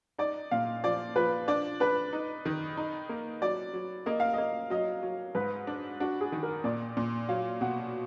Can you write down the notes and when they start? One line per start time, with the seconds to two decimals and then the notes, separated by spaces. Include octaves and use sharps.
0.18 D#4 D5
0.51 A#2 F5
0.84 F3 D5
1.16 F3 B4
1.48 D4 D5
1.80 D4 B4
2.13 D#4
2.45 D#3
2.77 D#4
3.09 A#3
3.42 F#3 D5
3.73 F#3
4.06 A#3 D#5
4.20 F5
4.33 A#3 D#5
4.70 F#3 D#5
5.02 F#3
5.35 G#2 B4
5.67 D4
6.00 D4 F#4
6.21 G#4
6.32 D#3
6.43 A#4
6.64 A#2 D5
6.97 A#2
7.29 F#3 F5
7.61 B2 F#5